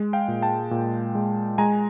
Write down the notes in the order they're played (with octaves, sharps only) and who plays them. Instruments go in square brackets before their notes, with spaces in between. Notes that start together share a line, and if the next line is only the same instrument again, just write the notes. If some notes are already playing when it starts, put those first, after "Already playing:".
Already playing: [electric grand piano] G#3
F5 G5
A#2
G5 A5
A#2
G#3
G#3 G#5 A#5